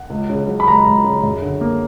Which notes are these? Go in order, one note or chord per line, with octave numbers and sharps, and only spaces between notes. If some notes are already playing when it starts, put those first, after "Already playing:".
Already playing: F#5
C#2
C#3
F#3
B5
C#2 A#5
C#2
C#3
F#2
D3
A#3